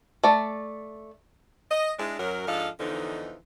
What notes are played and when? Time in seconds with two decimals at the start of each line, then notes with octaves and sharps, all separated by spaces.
0.24 A3 D5
1.71 D#5
1.99 G#3 D4 E4
2.20 F#2 F#3 A#4
2.47 G#2 F3 D4 A4 D#5 F5
2.80 E2 D3 E3 F3 D#4